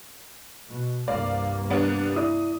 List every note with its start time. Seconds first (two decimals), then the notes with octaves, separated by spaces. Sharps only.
0.70 B2
1.08 C2 G2 A#3 D5 F5
1.70 G3 B3 D4
2.16 E4 D5 D#6